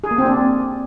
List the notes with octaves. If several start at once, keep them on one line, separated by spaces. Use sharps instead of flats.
G#4
A#3
C4
D4